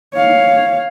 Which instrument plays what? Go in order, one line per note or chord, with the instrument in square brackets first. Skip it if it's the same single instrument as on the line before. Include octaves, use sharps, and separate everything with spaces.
[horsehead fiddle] C#5 F5